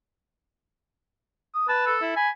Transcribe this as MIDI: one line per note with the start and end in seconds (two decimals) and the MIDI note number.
1.54 1.68 87
1.68 1.95 71
1.68 1.84 81
1.86 2.12 69
2.02 2.12 64
2.16 2.30 80
2.16 2.29 83